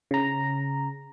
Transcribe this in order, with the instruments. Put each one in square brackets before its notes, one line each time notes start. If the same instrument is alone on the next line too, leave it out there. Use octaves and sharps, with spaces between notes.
[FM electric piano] C#3 A#5